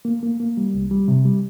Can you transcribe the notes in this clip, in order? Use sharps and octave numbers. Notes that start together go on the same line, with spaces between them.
A#3
A#3
A#3
G3
C2
G3
C3
G3